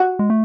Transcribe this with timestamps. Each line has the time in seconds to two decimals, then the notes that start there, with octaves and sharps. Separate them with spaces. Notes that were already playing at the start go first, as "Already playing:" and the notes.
Already playing: F#4
0.19 G#3
0.30 A3